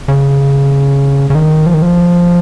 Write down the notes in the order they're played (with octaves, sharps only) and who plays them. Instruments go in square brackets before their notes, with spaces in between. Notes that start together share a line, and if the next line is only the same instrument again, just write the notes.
[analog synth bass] C#3
C#3
D#3
F3
D#3
F3